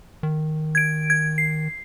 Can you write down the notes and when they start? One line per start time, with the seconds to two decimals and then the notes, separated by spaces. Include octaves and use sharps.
0.23 D#3
0.75 G#6 D7
1.10 G#6
1.38 C7